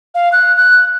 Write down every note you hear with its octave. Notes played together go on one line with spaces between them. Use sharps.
F5
F#6
F#6